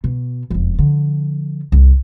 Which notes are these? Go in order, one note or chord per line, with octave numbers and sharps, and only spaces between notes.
B2
E1 F2
D3 F3
C2